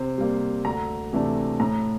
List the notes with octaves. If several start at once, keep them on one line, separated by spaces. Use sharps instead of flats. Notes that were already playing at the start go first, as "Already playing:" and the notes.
Already playing: C3 C5
G3 A#3
D2 A#5
C3 E3 A3 D4
A2 A#5